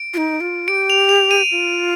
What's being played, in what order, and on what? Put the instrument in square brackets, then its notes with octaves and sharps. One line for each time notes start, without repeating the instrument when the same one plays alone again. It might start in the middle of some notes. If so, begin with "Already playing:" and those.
Already playing: [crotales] D7
[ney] F4
D#4
F4
[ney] G4 [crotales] D7
[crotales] F7
F7
D#7
[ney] F4